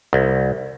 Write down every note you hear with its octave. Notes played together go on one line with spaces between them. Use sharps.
C2